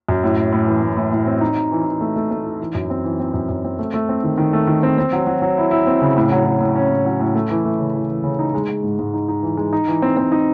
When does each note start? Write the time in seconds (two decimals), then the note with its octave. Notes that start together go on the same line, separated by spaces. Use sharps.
0.09 F#2
0.23 A2
0.37 A2
0.53 A2
0.67 E3
0.83 A2
0.97 A2
1.12 A2
1.26 C4
1.41 D#4
1.56 D#4
1.72 E3
1.85 E3
2.01 A3
2.16 A3
2.31 A3
2.46 D#4
2.60 E3
2.75 F#2
2.90 C4
3.04 E3
3.20 C4
3.34 F#2
3.49 F#2
3.65 C4
3.79 A3
3.94 A3
4.09 C4
4.23 D#3
4.38 D#3
4.53 A3
4.67 D#3
4.83 C4
4.98 C4
5.12 F#3
5.27 F#3
5.42 F#3
5.58 E4
5.71 E4
5.87 C4
6.01 C#3
6.16 A2
6.32 F#3
6.45 F#3
6.61 A2
6.75 C#4
6.90 A2
7.06 F#3
7.20 A2
7.35 A3
7.50 E3
7.65 A3
7.79 C#3
7.95 E3
8.10 E3
8.23 C#3
8.39 D#4
8.54 G#3
8.68 G#3
8.83 G#2
8.99 G#2
9.14 D#4
9.28 D#4
9.42 E3
9.57 G#3
9.73 D#4
9.88 E3
10.02 C4
10.17 C4
10.32 D#4